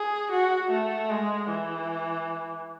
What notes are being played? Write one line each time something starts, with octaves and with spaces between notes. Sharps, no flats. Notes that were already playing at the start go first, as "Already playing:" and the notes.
Already playing: G#4
F#4
A3
G#3
E3